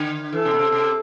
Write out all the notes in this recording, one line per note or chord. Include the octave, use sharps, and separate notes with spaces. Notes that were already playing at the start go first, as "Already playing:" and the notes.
Already playing: D3
E3 A4
C3
B2
C3
C3